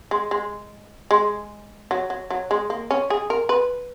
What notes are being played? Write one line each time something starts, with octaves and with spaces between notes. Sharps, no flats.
G#3
G#3
G#3
F#3
F#3
F#3
G#3
A#3
C#4
G#4
A#4
B4